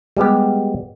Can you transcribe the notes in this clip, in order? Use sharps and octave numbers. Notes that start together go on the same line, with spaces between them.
G3 G#3 B3 G4